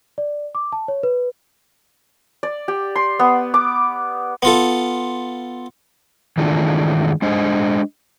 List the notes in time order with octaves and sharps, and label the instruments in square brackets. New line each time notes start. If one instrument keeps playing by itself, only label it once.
[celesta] D5
D6
A5
C#5
B4
[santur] D5
G4
C6
B3
D6
[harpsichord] B3 F4 A4
[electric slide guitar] D#3 E3 G#3 A3 D4 F4
G#3 D4 C5 D#5